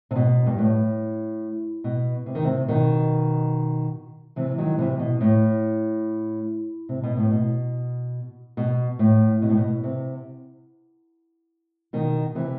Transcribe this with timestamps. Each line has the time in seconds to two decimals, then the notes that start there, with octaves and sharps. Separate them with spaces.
0.11 C3
0.16 B2
0.46 G2
0.58 A2
1.84 B2
2.26 C3
2.35 D#3
2.44 C3
2.68 B2 D#3
4.36 C3 E3
4.58 D#3 F#3
4.79 C3 E3
4.99 B2
5.21 A2
6.89 C3
7.03 B2
7.16 A2
7.31 B2
8.57 B2
8.99 A2
9.42 B2
9.49 A2
9.57 B2
9.83 C3
11.93 B2 D#3
12.35 C3 E3